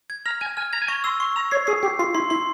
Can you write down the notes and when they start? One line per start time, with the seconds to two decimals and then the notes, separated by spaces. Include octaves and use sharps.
0.10 G#6
0.26 A#5 F6
0.41 G#5 G#6
0.57 G#5 F6
0.73 A#5 G#6
0.82 G#5
0.88 A#5 C#6
1.04 C6 E6
1.20 C6 C#6
1.36 A#5 E6
1.51 C#5 C7
1.67 G#4 C7
1.83 G4 C7
1.99 F4 C7
2.15 E4 C6
2.30 E4 C6